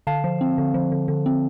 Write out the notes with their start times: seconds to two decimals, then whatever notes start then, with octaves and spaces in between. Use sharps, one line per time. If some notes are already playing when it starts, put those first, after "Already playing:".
0.07 D3 F5 A5
0.24 F3
0.41 C4
0.58 D3
0.74 F3
0.92 D3
1.08 D3
1.26 C4